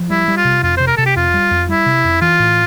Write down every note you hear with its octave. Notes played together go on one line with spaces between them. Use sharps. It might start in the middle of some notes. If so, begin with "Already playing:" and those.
Already playing: F3
G3 E4
G3
F4
C3
F2 F4
C3 C5
A#4
C3 A4
G4
F2 F4
G3
F2
G3 E4
C3
F2
E3 F4
A2